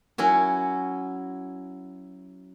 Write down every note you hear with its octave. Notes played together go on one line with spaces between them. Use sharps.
F#3 C#4 E4 F#4